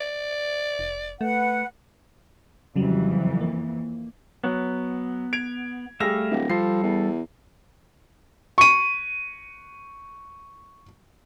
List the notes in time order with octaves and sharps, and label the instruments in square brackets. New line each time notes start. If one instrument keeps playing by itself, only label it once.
[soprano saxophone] D5
[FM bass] F1
[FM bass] A3 [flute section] B4 F#5
[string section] F2 E3 [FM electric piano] C#3 F#3 G3
[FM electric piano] A#3
[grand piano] F#3 [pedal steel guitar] B3
[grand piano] G#6 D7 F7
[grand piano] G3 G#4 A#6 [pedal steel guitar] A3 E5 F5
[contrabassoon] D1
[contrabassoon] F3 [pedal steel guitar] G3 A4 [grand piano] C7
[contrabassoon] E2
[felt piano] C#6 D#7